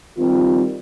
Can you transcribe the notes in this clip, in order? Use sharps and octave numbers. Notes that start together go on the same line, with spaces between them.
D#3 G3 C4 F4